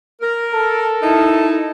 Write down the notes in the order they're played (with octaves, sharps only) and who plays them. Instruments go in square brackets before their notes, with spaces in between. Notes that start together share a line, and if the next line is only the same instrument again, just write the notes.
[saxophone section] A#4
[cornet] A4
[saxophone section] D#4 E4